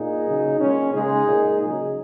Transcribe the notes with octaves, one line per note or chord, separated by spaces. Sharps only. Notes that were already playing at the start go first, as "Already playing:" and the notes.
Already playing: A#2 D#4 G#4
C#3 F#3
A#2 G#3 C#4
C#3 G#3 D#4 G#4
A#2 G#3
C#3 F#3 D#4 G#4